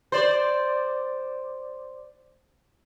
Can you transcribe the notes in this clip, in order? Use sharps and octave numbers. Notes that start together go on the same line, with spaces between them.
C5 D5